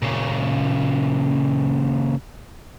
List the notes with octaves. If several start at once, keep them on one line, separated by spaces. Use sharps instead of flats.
A#2 C#3